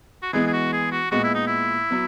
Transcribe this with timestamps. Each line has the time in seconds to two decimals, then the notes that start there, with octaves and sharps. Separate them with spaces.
0.23 F#4
0.33 E3 G#3 B3 G#4
0.47 G#4
0.53 F#4
0.73 G#4
0.92 F#4
1.11 A#2 G#3 B3 F#4
1.24 E4
1.35 D#4
1.47 E4
1.90 F#3 B3